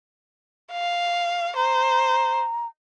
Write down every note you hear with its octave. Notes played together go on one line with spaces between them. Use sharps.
F5
C5 A#5